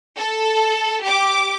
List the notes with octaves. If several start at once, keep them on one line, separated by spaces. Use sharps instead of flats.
A4
G4 D6